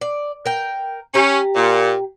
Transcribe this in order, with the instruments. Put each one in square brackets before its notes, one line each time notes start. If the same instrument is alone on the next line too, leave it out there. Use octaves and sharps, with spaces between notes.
[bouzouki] D5
A#4 G5
[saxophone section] C#4 [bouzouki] G4 A#5
[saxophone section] A#2